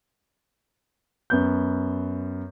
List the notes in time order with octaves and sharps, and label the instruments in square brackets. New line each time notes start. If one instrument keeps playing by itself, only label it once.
[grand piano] F#2 B3 G6